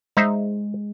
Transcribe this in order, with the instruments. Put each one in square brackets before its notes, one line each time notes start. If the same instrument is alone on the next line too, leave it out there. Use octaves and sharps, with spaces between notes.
[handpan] G#3 [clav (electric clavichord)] D#4 C5 E5